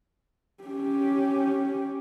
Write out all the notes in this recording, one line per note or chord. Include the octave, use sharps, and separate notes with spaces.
C#4 G4